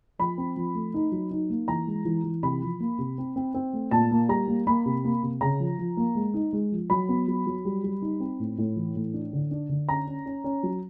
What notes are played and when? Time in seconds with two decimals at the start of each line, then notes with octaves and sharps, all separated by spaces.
0.19 F3 B5
0.38 C4
0.56 F3
0.75 A3
0.94 D#4
1.12 F#3
1.31 D#4
1.50 A#3
1.68 E3 A#5
1.87 G#3
2.05 E3
2.24 E3
2.43 C3 B5
2.62 F3
2.80 A#3
2.99 C3
3.18 C4
3.36 C4
3.54 C4
3.73 A3
3.91 A#2 A5
4.11 A#3
4.29 G3 A#5
4.48 A#3
4.67 A#3 B5
4.86 C3
5.04 A#3
5.23 C3
5.41 C#3 A#5
5.60 F3
5.78 F3
5.97 A#3
6.15 G#3
6.34 D#4
6.53 G#3
6.72 F3
6.90 F#3 B5
7.09 B3
7.28 F#3
7.46 F#3
7.65 G3
7.84 G3
8.02 D#4
8.20 C4
8.40 A2
8.58 A2
8.76 E3
8.96 A2
9.14 D4
9.33 D3
9.51 D4
9.69 D3
9.89 C#4 A#5
10.07 C#4
10.26 C#4
10.44 C#4
10.63 F#3